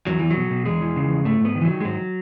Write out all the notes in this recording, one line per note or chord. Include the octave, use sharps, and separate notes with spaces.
E2 F#3
E2 E3
F#3
B2
B2
E2 G#3
E3
C#3
E2
G#2 A3
G#2 B3
D#3
E3
F#3
D#3
G#3
G#2 F#3